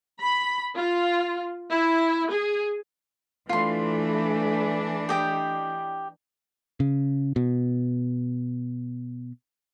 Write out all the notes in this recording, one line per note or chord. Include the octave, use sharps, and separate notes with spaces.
B5
F4
E4
G#4
E3 A3 D4 F4 C6
G4 D#5 G5
C#3
B2